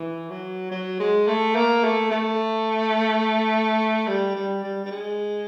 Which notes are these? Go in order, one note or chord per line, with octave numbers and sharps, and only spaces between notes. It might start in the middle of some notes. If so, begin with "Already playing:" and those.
Already playing: E3
F#3
F#3
G#3
A3
A#3
A3
A3
G3
G3
G3
G3
G#3